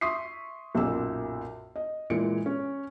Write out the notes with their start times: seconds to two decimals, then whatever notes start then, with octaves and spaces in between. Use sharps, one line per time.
0.01 E5 C6 C#6 D#6 B6 C7
0.75 B1 F#2 A#2 G4 E6
1.76 D#5
2.10 A#2 E3 G#3 G#4 C#7 D7
2.46 C#4